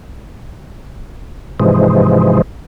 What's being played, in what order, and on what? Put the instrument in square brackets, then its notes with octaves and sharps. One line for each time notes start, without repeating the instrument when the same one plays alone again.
[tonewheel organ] G#2 C3 E3 F3 G#3